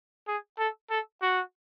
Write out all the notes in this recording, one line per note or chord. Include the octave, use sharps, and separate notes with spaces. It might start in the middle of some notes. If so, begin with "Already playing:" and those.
G#4
A4
A4
F#4